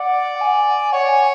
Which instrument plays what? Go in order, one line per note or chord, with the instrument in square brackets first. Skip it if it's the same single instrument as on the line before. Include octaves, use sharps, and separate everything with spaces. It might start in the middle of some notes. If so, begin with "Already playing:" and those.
Already playing: [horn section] D5 [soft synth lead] F#5
[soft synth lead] F#5
G#5
[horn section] C#5 [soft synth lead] F#5
[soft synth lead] G#5